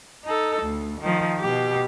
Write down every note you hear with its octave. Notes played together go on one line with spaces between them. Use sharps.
D#4 A4
D2
D#3 F3
B2 G4